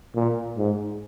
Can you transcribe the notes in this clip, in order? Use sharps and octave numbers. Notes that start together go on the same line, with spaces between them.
A#2
G#2